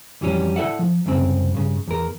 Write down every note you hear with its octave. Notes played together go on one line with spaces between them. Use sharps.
F2 E3 F#3 G3 C#4
E4 A4 D5 E5 F#5
F3
C2 F#2 C#3 C4
G2 C#3
E2 A#4